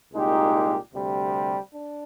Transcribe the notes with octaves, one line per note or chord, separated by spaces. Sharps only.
C2 A#2 G#3 D#4 G4
D2 C3 G3
D4